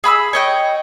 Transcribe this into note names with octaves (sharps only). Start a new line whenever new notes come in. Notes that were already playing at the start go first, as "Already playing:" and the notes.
G#4 B5 D#6 E6
C#5 D#5 G5